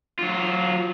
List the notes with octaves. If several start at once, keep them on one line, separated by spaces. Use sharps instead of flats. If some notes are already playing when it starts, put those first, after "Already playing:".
F#3 F4